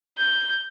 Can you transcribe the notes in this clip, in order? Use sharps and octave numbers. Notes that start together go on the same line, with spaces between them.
G6